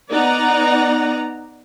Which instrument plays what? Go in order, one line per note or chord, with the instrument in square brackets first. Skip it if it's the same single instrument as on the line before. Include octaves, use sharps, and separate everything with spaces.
[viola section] B3 D#4 D5 F#5 A#5